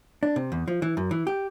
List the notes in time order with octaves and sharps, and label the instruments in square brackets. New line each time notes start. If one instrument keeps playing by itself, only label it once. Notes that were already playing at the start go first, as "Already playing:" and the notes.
[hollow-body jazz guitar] D4
C3
E2
F3
E3
F#2
E3
G4